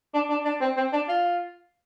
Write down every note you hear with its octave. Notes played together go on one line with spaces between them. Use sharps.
D4
D4
D4
C4
C4
D4
F4